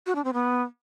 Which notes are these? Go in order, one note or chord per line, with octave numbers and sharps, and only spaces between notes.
F#4
D4
C4
B3